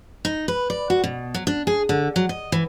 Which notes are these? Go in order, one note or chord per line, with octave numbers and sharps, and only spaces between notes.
D#4
B4
D5
F#4
B2
F#3
D4
G#4
D3
F#3
D#5
E3